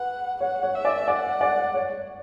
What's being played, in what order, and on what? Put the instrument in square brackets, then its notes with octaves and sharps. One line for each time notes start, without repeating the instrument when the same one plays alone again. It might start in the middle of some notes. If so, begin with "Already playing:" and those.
Already playing: [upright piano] B4 [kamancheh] F#5
[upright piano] C#5 [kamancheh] F#5
[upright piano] C#5
[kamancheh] E5
[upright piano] D5
[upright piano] D5 [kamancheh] F#5
[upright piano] D5
C#5